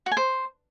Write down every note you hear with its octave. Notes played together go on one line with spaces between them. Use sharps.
F#4
G#5
C5